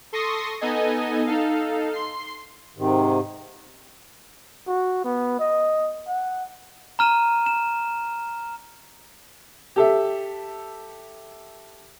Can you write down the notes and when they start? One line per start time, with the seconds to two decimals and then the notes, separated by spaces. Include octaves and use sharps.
0.13 A4 C6 C#6 D#6 A#6 C7
0.61 B3 D#4 A4 D#5 G#5
1.26 D#4 A4 F5
1.93 C6 C7
2.77 G#2 C3 D#3
4.67 F#4
5.04 B3
5.40 D#5
6.07 F#5
6.99 A#5 F6 D#7 E7
7.46 E7
9.76 G4 A4 E5